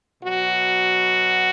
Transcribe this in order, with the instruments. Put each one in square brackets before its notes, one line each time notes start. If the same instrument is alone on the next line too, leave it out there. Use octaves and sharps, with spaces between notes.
[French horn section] B2 F#3 F#4